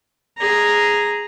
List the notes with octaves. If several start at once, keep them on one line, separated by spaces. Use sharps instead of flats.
G#4 A#5